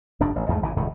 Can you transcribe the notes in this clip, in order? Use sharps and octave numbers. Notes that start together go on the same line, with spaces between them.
F1 G2 D4
A1
E2 G#2 A3
G#1 C#3 E3
D#1 C#2 A2 D#3